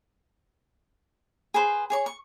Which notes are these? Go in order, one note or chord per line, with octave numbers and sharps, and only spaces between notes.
G#4 B4 C5
G#4 C#5 C#6
C#6